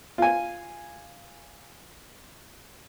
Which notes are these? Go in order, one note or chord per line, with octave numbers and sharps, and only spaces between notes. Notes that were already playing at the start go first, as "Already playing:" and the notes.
F4 G#5